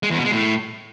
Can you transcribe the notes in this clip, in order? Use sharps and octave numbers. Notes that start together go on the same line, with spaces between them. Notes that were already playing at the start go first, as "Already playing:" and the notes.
G#3
E2
B2
G#3
A2